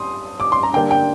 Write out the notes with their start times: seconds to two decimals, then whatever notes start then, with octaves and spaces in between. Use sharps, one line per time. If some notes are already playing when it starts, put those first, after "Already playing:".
Already playing: G3 C6 D#6
0.40 D6
0.52 C6
0.63 A#5
0.73 D3 G3 A#3 D4 G5
0.91 G5